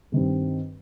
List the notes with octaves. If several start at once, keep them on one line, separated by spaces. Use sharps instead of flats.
G2 D#3 G3 C4